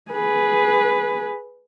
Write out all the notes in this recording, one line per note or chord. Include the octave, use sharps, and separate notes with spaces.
G#4 B4